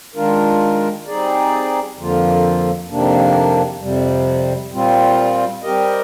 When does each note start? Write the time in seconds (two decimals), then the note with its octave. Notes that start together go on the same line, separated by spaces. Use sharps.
0.15 D#3 G#3 D4 F4 A#4
1.07 G3 C4 D#4 G#4 D5
1.98 F2 D3 F3 A#3 F4
2.89 F2 C3 D#3 A#3 D4
3.81 F2 C3 G3
4.71 A#2 G3 C4 F4
5.63 G3 C4 G4 A#4 D#5